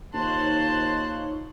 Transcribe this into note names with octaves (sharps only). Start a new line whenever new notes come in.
D#2 D#4 F4 C5 C#5 A5 C6 F#6